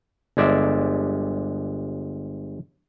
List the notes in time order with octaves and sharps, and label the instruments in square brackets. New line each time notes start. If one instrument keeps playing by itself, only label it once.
[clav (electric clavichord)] G1 G#3 D5 E5